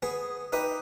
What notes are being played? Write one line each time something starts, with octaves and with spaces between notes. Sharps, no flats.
B3 G#4
D#4 G4 B4 D#6